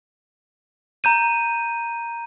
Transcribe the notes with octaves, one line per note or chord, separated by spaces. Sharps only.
A#5 G6 D#7